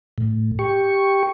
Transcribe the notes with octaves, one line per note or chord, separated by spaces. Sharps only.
A2
G4 C#6